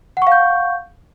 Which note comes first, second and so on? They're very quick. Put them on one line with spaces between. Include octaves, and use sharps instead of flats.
F#5 C#6 F5 G6